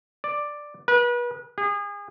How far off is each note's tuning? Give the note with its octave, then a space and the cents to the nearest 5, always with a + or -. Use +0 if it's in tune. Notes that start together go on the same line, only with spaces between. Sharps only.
D5 +5
B4 -35
G#4 -35